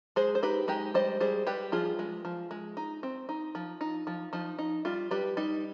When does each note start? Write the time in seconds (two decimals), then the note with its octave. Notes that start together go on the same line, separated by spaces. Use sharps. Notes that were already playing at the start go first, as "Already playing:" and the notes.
0.16 G#3 G#4 C5
0.35 C5
0.43 D#4 G4 B4
0.68 G#3 D#4 G4
0.94 G3 C5 D#5
1.20 G3 G#4 C5
1.47 G3 G4 B4
1.72 F3 F4 G#4
1.99 G#3
2.25 F3
2.51 G#3
2.77 D#4
3.03 C4
3.29 D#4
3.55 F3
3.81 D#4
4.07 F3
4.33 F3 D#4
4.59 D#4
4.85 G3 F4
5.11 G3 G4 B4
5.37 G3 D#4